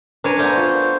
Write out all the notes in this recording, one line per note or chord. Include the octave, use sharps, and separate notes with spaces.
D4 A#4 B4 C#5 G#5 A#5
A3 B3 A#4 C5 D5
F4 C#6